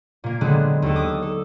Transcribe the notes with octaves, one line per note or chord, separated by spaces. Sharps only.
A#2 A#3
D3 F#3 G#3 B3 C4 D4
D#2 A4
D6 D#6
A4